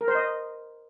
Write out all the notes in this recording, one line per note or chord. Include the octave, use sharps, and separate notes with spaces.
A#4
C5
D#5